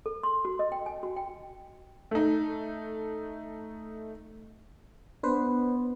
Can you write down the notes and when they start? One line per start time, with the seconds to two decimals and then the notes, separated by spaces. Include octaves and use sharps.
0.06 A4
0.23 C6
0.45 F#4
0.59 D#5
0.72 G5
0.86 G#5
1.03 F#4
1.16 G5
2.11 A3 D#4
5.23 B3 D4 B4 C5